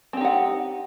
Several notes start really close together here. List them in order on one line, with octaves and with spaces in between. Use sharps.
C4 G4 D#4 F#5